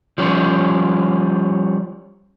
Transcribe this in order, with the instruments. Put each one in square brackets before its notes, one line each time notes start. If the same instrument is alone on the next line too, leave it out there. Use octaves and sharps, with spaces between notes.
[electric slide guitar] F3 G3 C#4